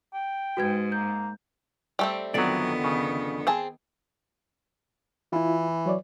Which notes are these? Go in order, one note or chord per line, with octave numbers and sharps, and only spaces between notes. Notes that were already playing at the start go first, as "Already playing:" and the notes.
G5
G#2 F#4 B4 G#6
A#3 G6
G3 A3 C4
F2 D3 D#3 F#3 B3 D5
C#3
C4 G#4 A5
E3 E4 F4
F#3 C#5 D5